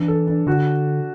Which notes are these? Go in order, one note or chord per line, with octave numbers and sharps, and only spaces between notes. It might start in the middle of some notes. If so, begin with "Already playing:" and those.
Already playing: E3 D4
A4
D4
D3 F#4